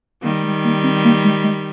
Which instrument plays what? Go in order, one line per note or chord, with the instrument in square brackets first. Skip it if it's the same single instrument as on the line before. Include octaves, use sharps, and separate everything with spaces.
[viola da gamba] D#3 G3 [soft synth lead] A#3
[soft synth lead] G#3
A#3
C4
A#3
G#3
G#3